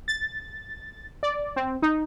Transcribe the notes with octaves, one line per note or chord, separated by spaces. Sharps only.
A6
D5
C4
D#4